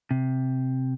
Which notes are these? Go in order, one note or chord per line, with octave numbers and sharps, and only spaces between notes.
C3